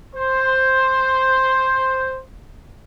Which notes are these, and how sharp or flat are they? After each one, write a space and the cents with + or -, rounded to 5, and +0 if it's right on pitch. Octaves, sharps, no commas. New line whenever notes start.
C5 +5